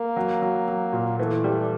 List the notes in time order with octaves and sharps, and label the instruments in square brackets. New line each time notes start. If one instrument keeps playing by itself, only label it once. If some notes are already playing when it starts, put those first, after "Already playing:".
Already playing: [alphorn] A#3
[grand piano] F#3
F#3
F#3
A#2
[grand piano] E3 [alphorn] A3
[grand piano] G3